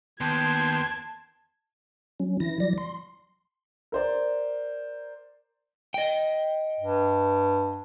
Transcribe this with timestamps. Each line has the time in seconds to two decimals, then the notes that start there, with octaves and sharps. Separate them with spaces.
0.21 D#2 B3 G5 A5 C6 G#6
2.20 F#3 C#4
2.40 E3 E4 A#6
2.60 F3 F#3 D5 A#6
2.78 C6
3.92 A#4 C5 D5
5.94 D#5 G5
6.80 G2